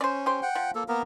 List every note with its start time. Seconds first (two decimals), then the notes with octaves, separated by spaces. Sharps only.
0.01 C#4 C5 D5
0.26 G4 C5
0.42 F#5 G5
0.55 F3
0.75 A#3 A4
0.88 A#3 B3 A#4